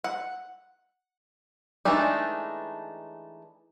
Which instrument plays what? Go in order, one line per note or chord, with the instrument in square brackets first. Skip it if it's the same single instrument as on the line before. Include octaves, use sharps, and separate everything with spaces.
[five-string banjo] F#5
E3 G#3 A3 D4 D#4